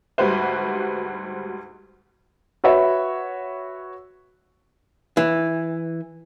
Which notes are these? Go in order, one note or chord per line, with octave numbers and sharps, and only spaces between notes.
D2 G#2 G3 F#4 B4 C5
F#4 B4 C#5 E5
E3